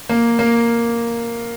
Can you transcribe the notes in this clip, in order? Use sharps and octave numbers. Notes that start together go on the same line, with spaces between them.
A#3
A#3